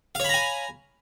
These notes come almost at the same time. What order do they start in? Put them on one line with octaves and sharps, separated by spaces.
F5 C#5 B5 A#5 G#5